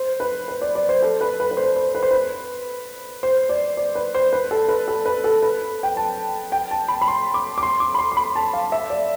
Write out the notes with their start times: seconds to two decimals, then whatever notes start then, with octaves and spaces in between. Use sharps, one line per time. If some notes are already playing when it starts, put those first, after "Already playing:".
Already playing: C5
0.20 B4
0.48 B4
0.62 D5
0.75 D5
0.89 C5
1.02 A4
1.21 B4
1.40 B4
1.51 B4
1.57 C5
1.76 C5
1.95 B4
2.03 C5
2.11 B4
3.23 C5
3.49 D5
3.77 D5
3.95 B4
4.14 C5
4.33 B4
4.51 A4
4.68 B4
4.88 A4
5.05 B4
5.24 A4
5.42 B4
5.83 G5
5.97 A5
6.52 G5
6.71 A5
6.88 B5
7.01 B5
7.08 C6
7.34 D6
7.58 D6
7.63 C6
7.80 D6
7.94 B5
7.98 C6
8.12 C6
8.17 B5
8.36 A5
8.53 F5
8.72 E5
8.90 D5